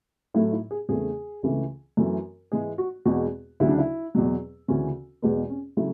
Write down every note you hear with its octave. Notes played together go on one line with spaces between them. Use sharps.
A2 F#3 A3 E4
E4
G#4
E2 C#3 E3 A3 G#4
C#2 C#3 E3 A3
F#2 E3 A3
G#2 E3 G#3 G#4
F#4
E2 B2 G#3 F#4
D2 C#3 F#3 E4
D4
E4
E2 B2 F#3
D2 C#3 E3 C#4
E2 B2 G#3 B3
C#4
C#3 F#3 A3 E4